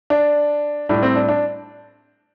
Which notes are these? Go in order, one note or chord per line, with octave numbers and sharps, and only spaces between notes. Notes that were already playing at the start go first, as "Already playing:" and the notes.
D4
A2 G3 D4
C4
D4
D4